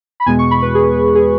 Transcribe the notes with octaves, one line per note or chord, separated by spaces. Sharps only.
B5
E2 B2 G#3 G#5
C#6
B5
B4
G#4
G#4